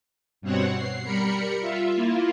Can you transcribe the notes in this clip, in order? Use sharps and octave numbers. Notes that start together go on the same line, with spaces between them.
G2 B2 C4 C#5 F#5
C7
G3 A#4 B5 C#7
F4 E5
A#3 E4 F4